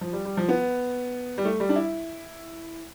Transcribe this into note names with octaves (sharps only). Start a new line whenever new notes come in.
F3
G3
G3
F3
B3
G3
A3
G3
D4
E4